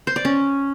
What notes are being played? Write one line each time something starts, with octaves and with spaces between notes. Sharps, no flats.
C5
D5
C#4